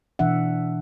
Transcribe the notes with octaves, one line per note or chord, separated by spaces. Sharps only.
B2 E3 D4 E5 F#5